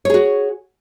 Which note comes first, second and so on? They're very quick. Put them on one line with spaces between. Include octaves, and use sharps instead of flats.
C#5 G#4 F#4